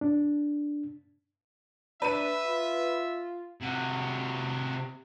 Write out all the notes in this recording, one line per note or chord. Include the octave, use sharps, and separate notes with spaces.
D4
D4 B4 E5 D#7
F4
C3 F#4